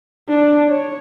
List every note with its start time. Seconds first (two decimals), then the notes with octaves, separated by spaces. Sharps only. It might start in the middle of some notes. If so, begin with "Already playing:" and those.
0.29 D4
0.69 C#5